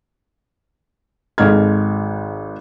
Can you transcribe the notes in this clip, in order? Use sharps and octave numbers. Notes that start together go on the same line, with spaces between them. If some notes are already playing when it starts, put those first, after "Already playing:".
G#1 G#2 A4 F6 G#6